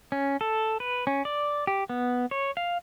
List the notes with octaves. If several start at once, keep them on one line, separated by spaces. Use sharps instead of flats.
C#4
A4
B4
C#4
D5
G4
B3
C#5
F5